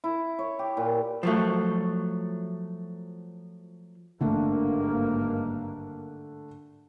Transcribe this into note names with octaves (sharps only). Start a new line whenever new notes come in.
E4
C#5
G4
A#2
F3 F#3 A3
G#1 G2 D3 A3 A#3 D4